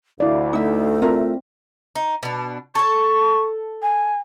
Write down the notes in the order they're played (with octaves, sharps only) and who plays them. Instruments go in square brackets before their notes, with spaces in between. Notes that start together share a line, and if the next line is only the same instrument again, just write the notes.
[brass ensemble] D2 [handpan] E4 D5 [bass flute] F5
[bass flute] A3 [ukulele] D#4 E5
[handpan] C4 [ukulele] F4 A#4 E5
[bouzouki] D#4
B2 D4
[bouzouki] A4 A5 [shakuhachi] C#6
[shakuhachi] G#5